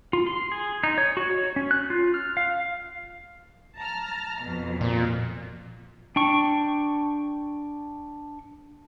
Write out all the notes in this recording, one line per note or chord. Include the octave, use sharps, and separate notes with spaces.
F4
C6
G#4
D#4
C#5
F#4
C#5
C#4
F#6
F4
F6
F5
A5 A#5 F6
F2 B2
A#2
D4 G5 C#6